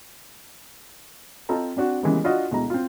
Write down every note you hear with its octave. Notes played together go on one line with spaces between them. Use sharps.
C4 F4 A4 D#5 A#5
C4 D4 F#4
C#3 E3 G3 G#3 A#3 B3
D4 F4 F#4 D#5
D2 B2 G#3 E4 A#5
C4 F4